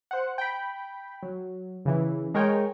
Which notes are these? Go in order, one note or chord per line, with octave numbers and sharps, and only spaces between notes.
C5 F#5
G5 B5
F#3
C#3 E3
G#3 A#4 C#5 G5 G#5